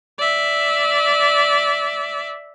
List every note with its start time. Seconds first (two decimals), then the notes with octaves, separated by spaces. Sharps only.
0.18 D5 E5